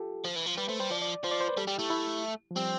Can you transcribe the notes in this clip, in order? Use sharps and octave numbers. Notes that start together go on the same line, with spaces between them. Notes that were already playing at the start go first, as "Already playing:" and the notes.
Already playing: F4 G4 A4
F3
E3
F3
G3 B4
A3 C5
G3 C5
F3 D5
D5
F3 C5
D5
C5
B4
G3 A4
G3 G4
A3 E4
E4
F3
G3 C4